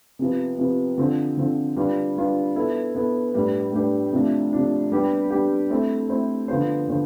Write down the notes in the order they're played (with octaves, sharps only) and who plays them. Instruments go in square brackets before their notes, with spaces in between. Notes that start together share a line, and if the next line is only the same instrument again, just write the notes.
[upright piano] C3 F3 B3
C3 F3 B3
D3 F3 C4
D3 F3 C4
G3 D4 F4 B4
G3 D4 F4 B4
B2 B3 E4 A4
B2 B3 E4 A4
A2 G3 D4 G4 B4
A2 G3 D4 G4 B4
C3 F3 A3 D4
C3 F3 A3 D4
G3 B3 D4 G4
G3 B3 D4 G4
A3 C4 E4 A4 C5
A3 C4 E4 A4 C5
D3 F3 B3 F4 C5
D3 F3 B3 F4 C5